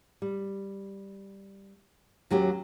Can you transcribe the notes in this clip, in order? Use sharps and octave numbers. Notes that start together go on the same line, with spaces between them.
G3
D#2 F#3 C#4 G4